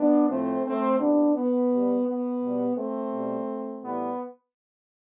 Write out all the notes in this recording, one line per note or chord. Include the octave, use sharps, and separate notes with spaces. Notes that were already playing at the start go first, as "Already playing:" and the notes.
Already playing: B3 D4
A2 F3 A3 C4
A3 C4
C3 E3 G3 B3 D4
B3
B2 G3
B3
B2 G3
A3 C4
B2 G3
A2 E3 G3 B3